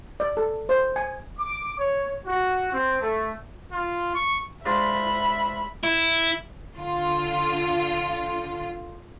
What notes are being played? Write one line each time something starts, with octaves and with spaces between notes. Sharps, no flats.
D5
A4
C5
G#5
D6
C#5
F#4
C4
A3
F4
C#6
G#2 D4 F4 E5 B5
E4
D3 F4